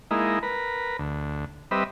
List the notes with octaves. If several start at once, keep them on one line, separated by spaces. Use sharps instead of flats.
G#3 A#3 D#4 E4
A#4 B4
D2
G3 C4 B4 D#5 E5